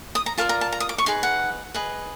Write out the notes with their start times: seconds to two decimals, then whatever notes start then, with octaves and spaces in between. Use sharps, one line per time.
0.15 D#6
0.26 A#5
0.38 F4 A#4 D5 A5
0.49 A#5
0.61 A5
0.72 A#5
0.80 D#6
0.89 D6
0.98 C#6
1.06 D#4 G#4 B4 C6
1.23 F#5
1.74 G#4 B4 D#5